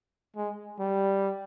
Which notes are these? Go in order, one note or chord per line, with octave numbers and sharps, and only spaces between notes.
G#3
G3